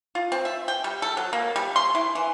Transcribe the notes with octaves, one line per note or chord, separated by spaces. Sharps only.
F4
C4
E5
G5
G3
A4
F#3
A#3
G3
C6
E4
E3